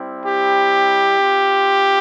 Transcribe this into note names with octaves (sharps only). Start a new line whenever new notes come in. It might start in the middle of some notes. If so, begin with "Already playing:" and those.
Already playing: G3 C4 E4
G4
C4 F4